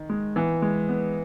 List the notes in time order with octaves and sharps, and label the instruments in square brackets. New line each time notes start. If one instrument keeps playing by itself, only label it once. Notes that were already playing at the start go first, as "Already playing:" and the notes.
Already playing: [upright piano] D#3
[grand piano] G#3
[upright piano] E3 [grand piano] B3
[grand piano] G#3
B3